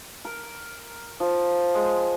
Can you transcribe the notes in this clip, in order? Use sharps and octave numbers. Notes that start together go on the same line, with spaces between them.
A#4
F3
G#3